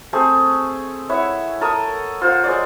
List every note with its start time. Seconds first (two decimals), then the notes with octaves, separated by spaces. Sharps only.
0.13 A3 C4 G#4
1.09 E4 C#5 E5 F#5
1.61 A4 A#4 C#6 D#6
2.21 F4 C5 F#5
2.44 G#3 C#5 D5